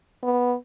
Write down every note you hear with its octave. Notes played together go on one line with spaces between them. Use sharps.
B3